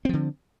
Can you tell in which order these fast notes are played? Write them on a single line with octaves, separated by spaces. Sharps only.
C4 F3 D3